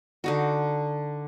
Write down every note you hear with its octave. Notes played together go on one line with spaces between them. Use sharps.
D3 D#4 F#4